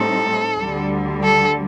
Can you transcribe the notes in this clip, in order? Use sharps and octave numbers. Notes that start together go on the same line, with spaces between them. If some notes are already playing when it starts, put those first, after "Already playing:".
Already playing: A2 G3 C4 D#4 A4
D2 D3 G3
A4